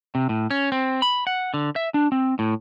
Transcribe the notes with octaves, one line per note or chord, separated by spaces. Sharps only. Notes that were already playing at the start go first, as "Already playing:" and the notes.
C3
A2
C#4
C4
B5
F#5
D3
E5
D4
C4
A2